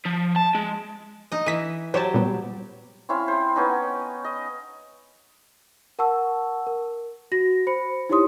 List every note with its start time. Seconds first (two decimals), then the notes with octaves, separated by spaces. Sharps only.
0.05 F3
0.36 A5
0.55 G#3
1.32 D#4 D#5
1.46 E3 A#6 B6 D#7
1.94 F#3 G4 C5 C#5 A5
2.14 A#2 G3 B3
3.09 C4 C#4 E4 F5
3.28 C5 G5
3.56 B3 C#4 D#4
4.24 D#5
5.99 A#4 F#5 A5 C#6 E6
6.67 A#4
7.32 F#4 A#6
7.67 C5 B5 C#7
8.09 D#4 E4 G4 C#5 C6 D#6